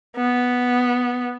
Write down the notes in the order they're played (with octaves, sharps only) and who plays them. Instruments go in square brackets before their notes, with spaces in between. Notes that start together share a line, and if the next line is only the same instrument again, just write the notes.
[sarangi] B3